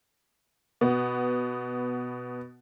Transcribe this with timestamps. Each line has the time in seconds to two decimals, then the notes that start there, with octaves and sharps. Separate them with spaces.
0.81 B2 B3